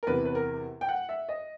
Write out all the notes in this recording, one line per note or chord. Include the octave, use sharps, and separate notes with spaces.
A#4
E2 C3 E3 B4
B4
A#4
G5
F#5
E5
D#5